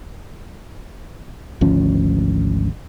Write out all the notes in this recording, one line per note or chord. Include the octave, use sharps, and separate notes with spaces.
G#1 D2 F3 C#4